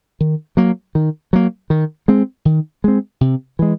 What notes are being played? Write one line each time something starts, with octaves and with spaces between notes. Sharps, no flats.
D#3
F#3 A#3
D#3
F#3 A#3
D#3
G#3 C4
D#3
G#3 C4
C3
E3 G#3